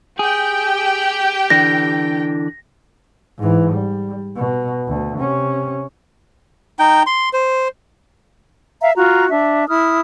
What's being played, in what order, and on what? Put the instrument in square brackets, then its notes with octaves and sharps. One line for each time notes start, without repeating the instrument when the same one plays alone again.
[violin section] G4 G5 [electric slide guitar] G#4
[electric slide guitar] D3 E3 D4 [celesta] A#6
[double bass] G#2 E3
G3
B2
D2
C3 C#4
[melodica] D#4 G5
C6
C5
[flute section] E5 F5 A#5
F4 F#4 A#5
D4 E5
E4 D#6 F6